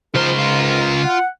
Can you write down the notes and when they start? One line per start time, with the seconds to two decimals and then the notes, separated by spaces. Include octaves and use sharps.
0.15 C#2 G#2 F4 A#4 C5 C6
0.39 F4 F5
1.04 F#5